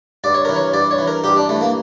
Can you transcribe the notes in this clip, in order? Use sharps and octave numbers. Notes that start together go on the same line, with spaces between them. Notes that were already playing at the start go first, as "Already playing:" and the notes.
G2 D5
C#5
E3 A#4
C#5
G2 D5
C#5
E3
A#4
G2 G4
D4
E3 A3
A#3